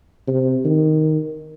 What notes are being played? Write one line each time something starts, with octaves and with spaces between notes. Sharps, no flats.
C3
D#3